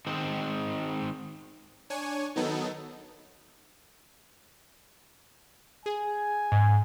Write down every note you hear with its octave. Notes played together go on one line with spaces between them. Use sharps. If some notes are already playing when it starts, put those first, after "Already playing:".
D#3 G#3 C4 C5
D4 C#5 G#5
D#3 F#3 B3 D#4 A4
G#4 G#5
G#2